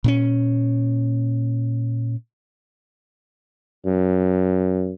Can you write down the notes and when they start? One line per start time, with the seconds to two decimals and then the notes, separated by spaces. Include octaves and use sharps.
0.04 A#2 C4 C#4
3.86 F#2